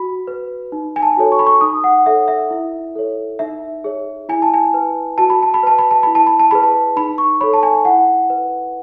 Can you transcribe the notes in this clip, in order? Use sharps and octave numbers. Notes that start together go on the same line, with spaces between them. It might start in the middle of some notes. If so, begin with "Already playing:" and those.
Already playing: F#4 B5
B4
D#4
G#5
A5
F#4 A4 C#5
C#6
B5
C#6
D#4 D#6
F#5
A4 C#5 E5
E5
E4
A4 C#5
D#4 E5
G#4 C#5
E4 G#5
A5
G#5
B4
F#4 A5
B5
A5
B5
B4 A5
B5
A5
E4 B5
A5
B5
A5
G#4 B4 B5
A5
D#4 B5
C#6
A4 C#5 B5
A5
G#5
E4 F#5
B4